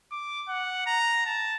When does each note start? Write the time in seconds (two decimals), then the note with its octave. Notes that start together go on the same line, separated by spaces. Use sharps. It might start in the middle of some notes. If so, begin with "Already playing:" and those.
0.12 D6
0.49 F#5
0.86 A#5
1.26 A5